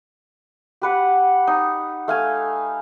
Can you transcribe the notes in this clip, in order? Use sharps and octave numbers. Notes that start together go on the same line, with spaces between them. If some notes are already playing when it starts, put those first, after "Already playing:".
G4 B4 F#5
D#4
A3 F5 G#5